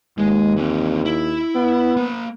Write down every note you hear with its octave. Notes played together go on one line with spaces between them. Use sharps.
D#2 G#3
E3 C4
E4
B3
A#3 B5